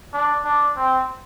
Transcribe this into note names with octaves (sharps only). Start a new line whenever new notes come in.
D4
D4
C4